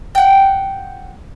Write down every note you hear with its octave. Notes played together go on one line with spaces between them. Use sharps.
F#5 G5